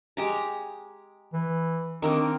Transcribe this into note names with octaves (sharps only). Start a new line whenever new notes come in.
G#3 G4 A#5
E3
D#3 A#3 C4 D4